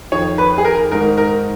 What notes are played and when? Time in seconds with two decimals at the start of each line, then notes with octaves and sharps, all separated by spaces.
0.12 F2 D#3 C#5
0.38 B4
0.58 G#4
0.65 A#4
0.91 G#2 D#3 A#4
1.18 A#4